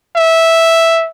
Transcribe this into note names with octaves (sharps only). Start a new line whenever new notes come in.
E5